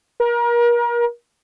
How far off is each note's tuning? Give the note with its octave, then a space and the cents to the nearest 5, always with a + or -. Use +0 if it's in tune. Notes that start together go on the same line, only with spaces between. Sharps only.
A#4 +30